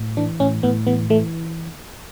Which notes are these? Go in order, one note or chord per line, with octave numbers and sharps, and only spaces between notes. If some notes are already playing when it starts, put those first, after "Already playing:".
Already playing: A2
E3 D4
A2 C#4
A2 B3
E3 B3
E3 A3